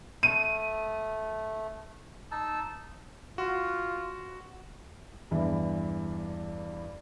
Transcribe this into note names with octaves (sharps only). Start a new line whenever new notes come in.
A3 D#7
D#4 A5 E6
F4 F#4
E2 G2 E3